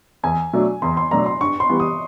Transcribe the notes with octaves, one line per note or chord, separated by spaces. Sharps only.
E2 G#5
B2 F#3 A3 D4
E2 C6
C6
B2 F#3 A3 D4 A#5
C6
G2 C#6
C6
E3 G3 B3
D#6